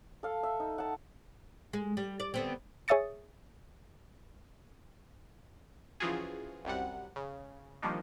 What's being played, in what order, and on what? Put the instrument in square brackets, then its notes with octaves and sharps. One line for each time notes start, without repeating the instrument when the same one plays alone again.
[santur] A4 F5
E5
D#4
F#5 A5
[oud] G#3
G3
D5
D3 B3 C4
[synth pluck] G#4 C#5 E5 D#6 A6 C#7
[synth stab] C#3 E3 F3 F4 F#4 G#4
C2 F#2 C3 G3 F#5
C#3
D#3 F3 G3 A#3 D4 D#4